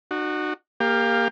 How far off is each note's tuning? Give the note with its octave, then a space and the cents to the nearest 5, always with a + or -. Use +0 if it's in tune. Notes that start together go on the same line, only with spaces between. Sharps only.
D#4 -45 F#4 +0
A#3 +0 G4 +25 F5 +5